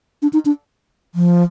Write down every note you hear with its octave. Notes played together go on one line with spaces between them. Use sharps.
D4
D#4
D4
F3